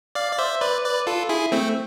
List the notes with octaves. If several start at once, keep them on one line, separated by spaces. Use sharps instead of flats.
D5 F5
D5
C5 E5
B4 D5
B4 D5
F4 A4
E4 G#4
A3 C4